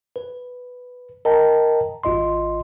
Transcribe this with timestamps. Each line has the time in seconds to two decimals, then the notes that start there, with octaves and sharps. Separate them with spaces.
0.16 B4
1.25 A#4 D#5 G5 A5 A#5
2.04 G#1 F4 D#5 C6